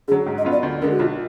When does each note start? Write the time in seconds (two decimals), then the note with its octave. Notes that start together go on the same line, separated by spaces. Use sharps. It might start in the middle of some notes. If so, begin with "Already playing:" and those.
0.08 D3 G#4
0.12 F#3
0.26 G#2
0.38 D#5
0.45 F#3 B3 F4
0.51 D5
0.63 D2
0.82 D3 G#3 A#4
0.91 F#4
0.99 B1 F4